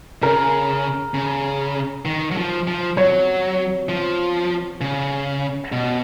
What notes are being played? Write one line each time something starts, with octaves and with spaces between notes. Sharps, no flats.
C#3 A#4
C#3
D#3
F#3
F3
F3
F#3 C#5
F3
C#3
B2